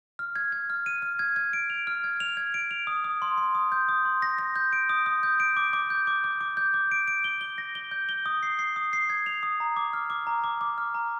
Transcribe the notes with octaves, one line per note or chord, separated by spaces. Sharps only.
F6
G#6
G#6
F6
D#7
F6
G#6
G#6
D7
F7
F6
G#6
F7
G#6
D7
F7
D#6
D#6
C6
C6
D#6
G6
D#6
C6
A#6
A#6
G6
D7
D#6
D#6
G6
D7
D6
D6
G6
D6
D6
D6
G6
D6
D7
D7
G7
G7
A#6
G7
G6
G7
D#6
C7
C7
D#6
C7
G#6
F7
D#6
A#5
D6
F6
D6
A#5
D6
D6
F6
A#5